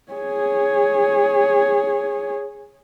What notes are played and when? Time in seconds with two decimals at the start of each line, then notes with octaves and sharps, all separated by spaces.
0.12 G#4 C#5